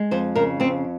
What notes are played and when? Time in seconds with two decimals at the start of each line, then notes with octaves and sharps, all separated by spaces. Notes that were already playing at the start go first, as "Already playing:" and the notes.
Already playing: G#3
0.11 F2 C5
0.35 C#3 A#4
0.60 F2 C4